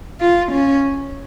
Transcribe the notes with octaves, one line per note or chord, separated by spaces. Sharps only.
F4
C#4